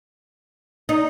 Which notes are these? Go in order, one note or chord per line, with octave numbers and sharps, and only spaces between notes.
D#4